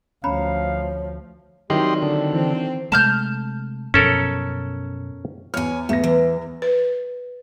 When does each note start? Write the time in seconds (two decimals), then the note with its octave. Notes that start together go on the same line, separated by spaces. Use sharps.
0.24 D2 F3 C#4 C#5 F5 A#5 B5
1.70 D#3 F#3 G3 C4 E4 G4 D#5 C6
2.02 D3
2.33 E3 C4
2.92 C3 G#3 A3 A5 F6 G6
3.94 F#2 B2 F3 C#4 A4 A#4
5.54 E2 C#5 G#5 F6
5.89 E2 A3 B3 A#6
6.04 E3
6.62 B4